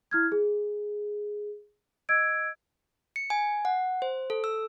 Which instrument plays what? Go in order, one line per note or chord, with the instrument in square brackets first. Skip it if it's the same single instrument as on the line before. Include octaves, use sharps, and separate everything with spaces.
[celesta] E4 F6 G#6
G#4
D#5 E6 G#6 D7
[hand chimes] C#7
G#5
F#5
C5
A4
E6